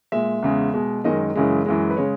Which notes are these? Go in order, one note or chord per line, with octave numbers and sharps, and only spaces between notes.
A#2 G#3 E5
E2 C#3 G#3
B2 G#3
F#2 D#3 G#3 D#5
F#2 C#3 E3 G#3
F#2 E3 G#3
B4
C#3 G#3 C#5